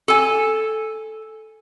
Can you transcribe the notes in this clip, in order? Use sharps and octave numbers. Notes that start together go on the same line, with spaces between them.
A4 G#5